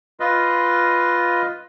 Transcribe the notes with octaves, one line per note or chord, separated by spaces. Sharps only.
F4 B4 D#5